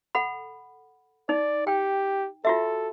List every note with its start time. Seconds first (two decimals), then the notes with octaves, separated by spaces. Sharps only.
0.15 A4 F#5 B5
1.29 D#4 D5
1.67 G4 G5
2.45 F4 F#4 A4 E5